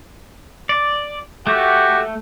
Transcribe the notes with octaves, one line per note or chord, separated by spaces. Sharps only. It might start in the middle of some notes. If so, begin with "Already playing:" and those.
D5
A3 F#4 G4